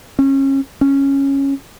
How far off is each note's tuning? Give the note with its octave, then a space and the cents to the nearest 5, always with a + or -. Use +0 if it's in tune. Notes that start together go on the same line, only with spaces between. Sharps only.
C#4 -30
C#4 -10